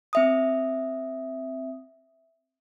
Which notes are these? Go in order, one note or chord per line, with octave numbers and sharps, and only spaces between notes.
C4 E5 D#6